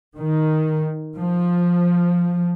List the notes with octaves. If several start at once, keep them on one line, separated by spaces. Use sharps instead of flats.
D#3
F3